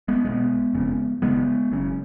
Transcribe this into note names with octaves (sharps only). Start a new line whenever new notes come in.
G#3 B3
B1 B2 G#3 B3
F#1 F2 C#3
F#1 F#2 C#3 G#3 B3
F#1 F#2 C#3